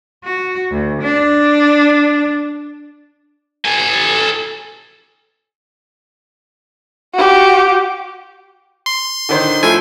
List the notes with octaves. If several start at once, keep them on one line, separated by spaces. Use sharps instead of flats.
F#4
D2
D4
A4 G#5
F#4 G4
C6
D3 D#3 C5
F3 A3 E4 G#5